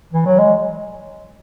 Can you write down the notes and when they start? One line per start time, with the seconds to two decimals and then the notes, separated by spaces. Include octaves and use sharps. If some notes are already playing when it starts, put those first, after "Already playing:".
0.13 E3
0.26 F#3
0.38 G#3